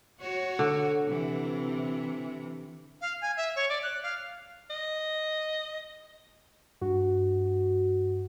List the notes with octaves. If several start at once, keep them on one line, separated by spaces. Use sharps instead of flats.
F#4 C#5
D3
C3 E3
F5
G#5
E5
C#5
D5
F#6
F5
D#5
G2 F#4